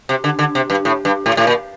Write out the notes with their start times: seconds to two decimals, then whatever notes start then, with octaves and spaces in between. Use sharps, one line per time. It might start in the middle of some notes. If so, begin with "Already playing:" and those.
0.09 C3
0.24 D3
0.39 D3
0.55 C3
0.70 G2
0.85 A2
1.05 G2
1.26 A2
1.37 A2
1.47 A#2